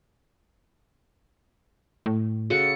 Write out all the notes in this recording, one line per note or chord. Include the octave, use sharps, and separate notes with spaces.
A2
C#3 F#4 A4 C#7